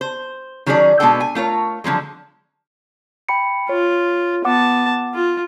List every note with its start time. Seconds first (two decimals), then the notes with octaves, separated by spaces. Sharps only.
0.01 C5
0.66 D#3 F#3 C#4 G#4 A#4 D5
1.00 B2 G#3 B3 D4 A4 G5
1.20 G#5
1.35 A3 F4 A#4 C#5
1.84 D3 F3 F#3 G#3
3.29 G5 B5 C#7
3.69 F4 C#5
4.45 B3 F#5 A5 D6
5.14 F4